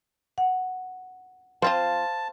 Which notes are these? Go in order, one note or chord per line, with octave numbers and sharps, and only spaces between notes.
F#5
F3 C4 F4 C5 F5 A5